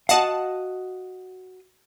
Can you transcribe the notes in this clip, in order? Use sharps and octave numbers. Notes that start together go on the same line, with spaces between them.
F#4 D#5 F5 F#5 A5